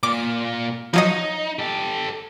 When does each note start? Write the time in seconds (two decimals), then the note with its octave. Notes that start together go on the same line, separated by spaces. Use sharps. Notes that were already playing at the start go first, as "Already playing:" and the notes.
0.03 A#2 A#3 D6
0.94 F3 F#3 D#4 D#5
1.59 G4 A4